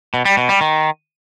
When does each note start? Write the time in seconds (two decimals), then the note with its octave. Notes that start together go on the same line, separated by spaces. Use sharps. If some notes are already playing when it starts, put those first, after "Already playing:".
0.14 B2
0.25 G3
0.37 B2
0.49 G3
0.61 D#3